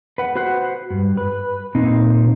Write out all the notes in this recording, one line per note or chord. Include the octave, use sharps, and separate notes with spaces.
B4 F#5
F#4 B4 C5 F#5
G2
B4
A#2 C4 D#4